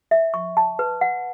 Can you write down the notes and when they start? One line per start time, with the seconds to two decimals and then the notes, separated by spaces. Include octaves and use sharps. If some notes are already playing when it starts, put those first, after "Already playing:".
0.11 E5
0.34 C#6
0.57 A5
0.79 B4
1.01 F#5